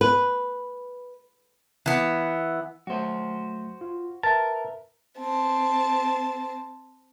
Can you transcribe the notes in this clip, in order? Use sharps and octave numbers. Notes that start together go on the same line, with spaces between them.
B4
E3 B3
F#3 A3 F#4 C5
F4
A#4 B4 E5 A5
C4 A5